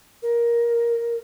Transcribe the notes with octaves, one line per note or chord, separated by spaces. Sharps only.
A#4